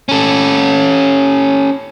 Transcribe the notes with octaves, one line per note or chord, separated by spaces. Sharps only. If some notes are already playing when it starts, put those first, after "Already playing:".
C#4 A4